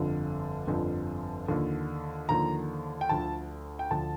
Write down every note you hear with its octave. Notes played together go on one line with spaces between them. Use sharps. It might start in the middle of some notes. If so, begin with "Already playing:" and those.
Already playing: G1 F2 D3 F3
G1 F2 D3 F3
D#2 D3 F3
D#2 D3 F3 A#5
G5
D2 D3 F3 A5
G5
D2 D3 F3 A5